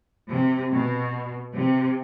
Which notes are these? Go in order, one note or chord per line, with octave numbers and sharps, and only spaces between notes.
C3
B2
C3